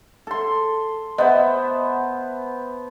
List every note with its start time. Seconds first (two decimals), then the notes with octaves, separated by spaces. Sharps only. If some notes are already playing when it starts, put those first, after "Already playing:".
0.27 A4 C6
1.18 B3 C5 D#5 E5